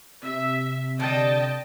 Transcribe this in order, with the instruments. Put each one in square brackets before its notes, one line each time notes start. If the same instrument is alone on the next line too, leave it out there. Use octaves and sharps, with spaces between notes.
[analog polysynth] C3 [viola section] E5
[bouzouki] D3 G3 [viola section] D#5 G5 A5